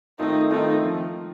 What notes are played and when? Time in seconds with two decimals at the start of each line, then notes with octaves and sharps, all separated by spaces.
0.19 D#3 A3 C4 D#4 F4 A4
0.51 D#3 A3 C4 D#4 F4 A4
0.82 F3